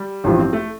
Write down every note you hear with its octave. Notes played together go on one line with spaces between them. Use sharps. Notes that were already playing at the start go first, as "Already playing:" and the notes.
Already playing: G3
A1 G2 F3
C4
A3